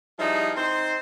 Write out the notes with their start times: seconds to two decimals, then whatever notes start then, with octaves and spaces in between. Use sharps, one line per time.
0.19 F3 G3 D#4 E4 G#4
0.57 C4 D#4 C5